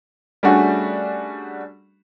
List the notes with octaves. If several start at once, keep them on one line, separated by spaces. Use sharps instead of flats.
G3 A3 C#4 D4 F#4 G#4